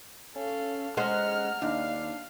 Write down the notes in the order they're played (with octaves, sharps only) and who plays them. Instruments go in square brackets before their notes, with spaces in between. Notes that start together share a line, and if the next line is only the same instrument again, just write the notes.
[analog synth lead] C#4 [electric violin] A4 F5
[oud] G#3 C#4 C5 [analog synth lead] F#5 [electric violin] A#5 F6
[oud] D#2 [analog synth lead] D4 [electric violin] F5